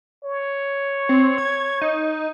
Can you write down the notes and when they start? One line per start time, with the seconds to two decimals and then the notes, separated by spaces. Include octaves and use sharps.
0.24 C#5
1.09 C4
1.38 G#6
1.81 D#4